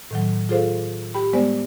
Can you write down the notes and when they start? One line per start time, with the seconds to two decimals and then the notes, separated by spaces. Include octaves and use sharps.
0.11 A2 D#3 F#3
0.49 F4 G#4 A4 C5 F5
1.15 G4 G5 B5
1.33 G3 G#3 B3 C5 D5